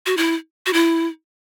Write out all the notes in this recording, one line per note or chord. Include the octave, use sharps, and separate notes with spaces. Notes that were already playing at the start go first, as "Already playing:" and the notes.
F#4
E4
F#4
E4